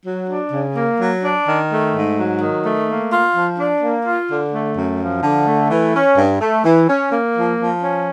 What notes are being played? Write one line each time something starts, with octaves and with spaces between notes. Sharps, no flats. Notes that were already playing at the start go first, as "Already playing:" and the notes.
F#3
D4
C#3
A#3
F#3
D4
D#3
A3
G#2
F#3
D#3
A3
A#3
F4
F3
D4
A#3
F4
D3
A3
F#2
F3
D3
A3
E3
C#4
G2
A3
E3
C#4
A#3
F3
F3
C#4